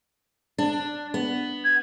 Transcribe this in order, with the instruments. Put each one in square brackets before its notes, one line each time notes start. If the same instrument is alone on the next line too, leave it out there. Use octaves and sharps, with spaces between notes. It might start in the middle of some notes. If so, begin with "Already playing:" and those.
[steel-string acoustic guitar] D4
B3
[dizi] G#6